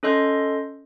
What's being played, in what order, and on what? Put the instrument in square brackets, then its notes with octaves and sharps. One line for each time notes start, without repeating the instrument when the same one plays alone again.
[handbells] C#4 A4 D#5 C6 G6